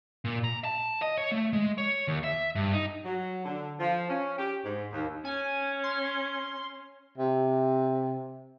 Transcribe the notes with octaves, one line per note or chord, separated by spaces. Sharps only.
A#2
A#5
A5
D#5
C#5
A3
G#3
C#5
D#2
E5
G2
D#4
F#3
D3
F3
C#4
G4
G#2
D#2
C#4 G#5
C6
C3